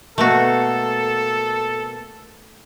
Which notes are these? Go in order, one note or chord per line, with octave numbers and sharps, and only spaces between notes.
B2 A3 A#3 F#4 A4